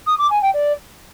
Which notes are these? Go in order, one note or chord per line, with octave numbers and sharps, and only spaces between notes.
D#6
D6
G#5
G5
D5